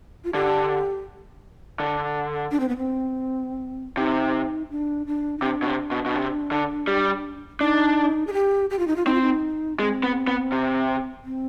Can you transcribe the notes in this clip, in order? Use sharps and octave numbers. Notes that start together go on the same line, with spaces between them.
F4
D3 G4
D3
D4
C4
B3
C4
C3 D#4
D4
D4
D#4
C3 D4
B2
C3
B2
B2
C3
D3
G3
D4 D#4
G#4
G4
G4
F4
D#4
F4
C4 D#4
F4
D#4
G#3 C4
B3
B3
C3
C4